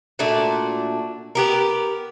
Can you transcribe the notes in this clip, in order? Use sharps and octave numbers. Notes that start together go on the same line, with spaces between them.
A#2 A3 D4 F#4
B3 G4 A#4